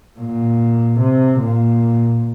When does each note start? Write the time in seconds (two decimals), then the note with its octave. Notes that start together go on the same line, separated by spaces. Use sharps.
0.20 A#2
0.99 C3
1.39 A#2